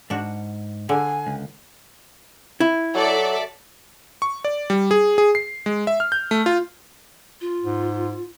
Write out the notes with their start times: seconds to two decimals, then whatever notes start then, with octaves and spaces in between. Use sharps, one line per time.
0.10 G#2 D4 F#4
0.89 D3 G#5
1.27 C#2
2.60 E4
2.94 F#3 A4 D5 E5
4.22 C#6
4.45 D5
4.70 G3
4.91 G#4
5.18 G#4
5.35 C7
5.66 G#3
5.87 E5
6.00 F6
6.12 G6
6.31 A3
6.46 F4
7.41 F4
7.63 G#2